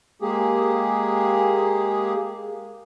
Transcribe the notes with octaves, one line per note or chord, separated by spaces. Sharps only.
G#3 A#3 G4 G#4